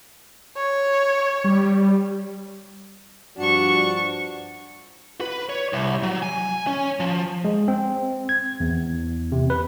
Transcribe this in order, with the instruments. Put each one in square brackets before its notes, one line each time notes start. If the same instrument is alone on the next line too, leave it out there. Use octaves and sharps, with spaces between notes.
[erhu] C#5
[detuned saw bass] G3
[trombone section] G2 F3 F#4 [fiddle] D4 C#6
[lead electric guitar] B4
C#5
C2
F#3
G#5
C#4
F3
[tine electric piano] G#3
C4
G#6
E2
C3
B4